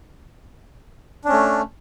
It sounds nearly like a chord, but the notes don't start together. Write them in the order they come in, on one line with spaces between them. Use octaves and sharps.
D4 C#4 A3